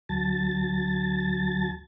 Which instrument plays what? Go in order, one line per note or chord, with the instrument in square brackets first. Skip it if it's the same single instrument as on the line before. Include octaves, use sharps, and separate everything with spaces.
[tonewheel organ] D2 F#3 A5 A6